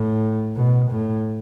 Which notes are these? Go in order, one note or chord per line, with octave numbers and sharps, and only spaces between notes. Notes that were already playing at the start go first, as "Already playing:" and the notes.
Already playing: A2
B2
A2